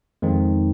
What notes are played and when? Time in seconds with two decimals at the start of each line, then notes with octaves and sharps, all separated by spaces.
0.22 F2 D#3 G#3 C4 D#4